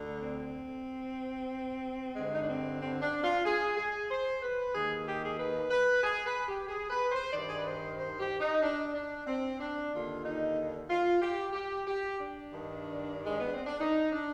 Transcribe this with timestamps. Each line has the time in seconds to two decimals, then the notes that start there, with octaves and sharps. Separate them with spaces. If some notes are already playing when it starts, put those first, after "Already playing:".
Already playing: D2 D3
0.22 C4
2.15 G2 D3 G#3
2.32 D#4
2.40 D4
2.49 C4
2.80 C4
3.02 D4
3.24 F4
3.45 G#4
3.77 G#4
4.10 C5
4.42 B4
4.75 D#2 D#3 G#4
5.07 G4
5.23 G#4
5.39 B4
5.71 B4
6.04 G#4
6.25 B4
6.47 G4
6.68 G#4
6.90 B4
7.12 C5
7.33 G2 D#3 D5
7.47 G#4
7.56 B4
7.65 C5
7.97 C5
8.19 G4
8.40 D#4
8.62 D4
8.95 D4
9.26 C4
9.59 D4
9.91 D#2 D3 F4
10.24 D#4
10.89 F4
11.21 G4
11.53 G4
11.86 G4
12.18 D4
12.50 G2 D#3
13.26 G#3
13.39 B3
13.53 C4
13.67 D4
13.80 D#4
14.12 D4